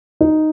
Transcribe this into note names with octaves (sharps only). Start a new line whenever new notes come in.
D#4